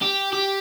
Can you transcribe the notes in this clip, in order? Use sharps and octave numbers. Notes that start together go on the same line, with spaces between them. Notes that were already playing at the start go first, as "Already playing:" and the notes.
G4
G4